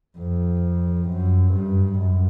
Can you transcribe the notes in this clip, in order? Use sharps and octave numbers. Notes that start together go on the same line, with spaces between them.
F2
F#2
G2
F#2